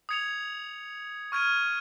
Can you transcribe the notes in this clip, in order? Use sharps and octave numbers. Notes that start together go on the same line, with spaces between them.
D#6 G#6 C#7 F7
C#6 F6 G#6 D#7